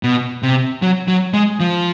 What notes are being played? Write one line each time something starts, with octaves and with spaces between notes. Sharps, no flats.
B2
C3
F#3
F#3
G#3
F3